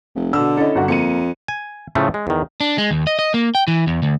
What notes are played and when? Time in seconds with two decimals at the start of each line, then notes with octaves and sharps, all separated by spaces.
0.15 F1
0.33 B2 D3 E6
0.57 C#4 E4 A4 D#5
0.75 G1 D3 F#4
0.88 F2 A#3 C#7 D#7
1.48 G#5
1.95 A2 C#3 F3 A3
2.14 G#3
2.27 E2 D#3
2.60 D4
2.78 G#3
2.91 D#2
3.07 D#5
3.19 D#5
3.34 A#3
3.55 G5
3.68 E3
3.87 E2
4.02 D2